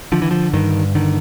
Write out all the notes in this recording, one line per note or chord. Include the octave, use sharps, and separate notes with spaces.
D3 F3
E3
F3
G2 D#3
D3 D#3